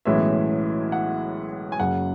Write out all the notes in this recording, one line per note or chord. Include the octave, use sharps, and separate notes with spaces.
B1 A2 E3 G#3 C#4 E5
F#5
G#5
F#1 F#2 C#3 F#5